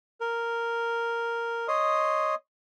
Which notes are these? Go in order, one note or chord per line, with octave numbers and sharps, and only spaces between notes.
A#4
C#5 D#5 C6 D#6